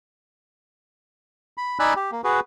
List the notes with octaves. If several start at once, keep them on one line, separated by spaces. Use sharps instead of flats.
B5
D#4 D5 G#5 B5 E6 F#6
G4
A#3
F#4 G#4 B4